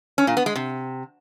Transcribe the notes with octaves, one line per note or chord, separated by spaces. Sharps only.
C#4
A#2
B3
G#3
C3